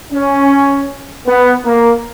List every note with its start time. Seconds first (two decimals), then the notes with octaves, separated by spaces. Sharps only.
0.13 C#4
1.27 B3
1.65 A#3